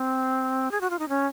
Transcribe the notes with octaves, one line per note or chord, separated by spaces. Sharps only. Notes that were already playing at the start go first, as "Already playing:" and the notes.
Already playing: C4
G#4
F#4
F4
D#4
C#4